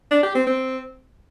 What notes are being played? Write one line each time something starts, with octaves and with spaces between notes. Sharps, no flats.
D4
G4
C4
C4